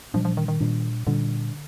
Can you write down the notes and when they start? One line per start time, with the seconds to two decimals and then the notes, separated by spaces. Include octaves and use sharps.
0.14 A#2 F3 G3 D4
0.25 F3
0.37 D#3
0.48 D#3
0.60 A#2 G3 D4
1.07 A#2 D3 G3 D4